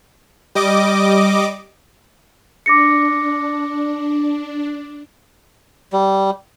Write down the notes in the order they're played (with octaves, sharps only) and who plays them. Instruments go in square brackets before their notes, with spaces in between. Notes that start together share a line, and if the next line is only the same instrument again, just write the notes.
[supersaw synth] G3 D#5 D6
[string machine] D4 [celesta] D6 A#6 C#7
[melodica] G3